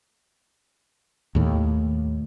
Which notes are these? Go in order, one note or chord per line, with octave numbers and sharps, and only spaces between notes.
D#2 A2